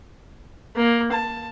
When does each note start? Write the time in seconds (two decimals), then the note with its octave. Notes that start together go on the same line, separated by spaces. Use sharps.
0.76 A#3
1.12 A5